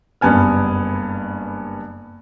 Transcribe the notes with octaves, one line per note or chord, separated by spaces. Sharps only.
F#1 G2 B3 G#5 F6